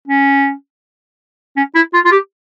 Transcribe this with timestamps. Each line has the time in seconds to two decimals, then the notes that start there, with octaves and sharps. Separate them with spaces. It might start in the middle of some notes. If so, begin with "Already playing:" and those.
0.08 C#4
1.57 C#4
1.75 E4
1.94 F4
2.05 F4
2.12 G4